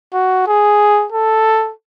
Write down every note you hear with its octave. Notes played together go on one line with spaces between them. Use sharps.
F#4
G#4
A4